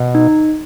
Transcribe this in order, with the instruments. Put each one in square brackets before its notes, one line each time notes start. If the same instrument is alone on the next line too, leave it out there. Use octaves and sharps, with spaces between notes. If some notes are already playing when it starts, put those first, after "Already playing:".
Already playing: [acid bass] B2
[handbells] D#4